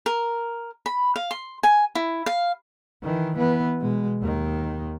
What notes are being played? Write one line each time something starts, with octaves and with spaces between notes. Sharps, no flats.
A#4
B5
F5
C6
G#5
E4
F5
D#3 E3
E3 B3
B2 G#3
D#2 D#3